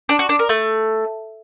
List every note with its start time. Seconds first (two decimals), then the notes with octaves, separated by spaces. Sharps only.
0.09 D4
0.19 F#4
0.29 D4
0.39 A#4
0.49 A3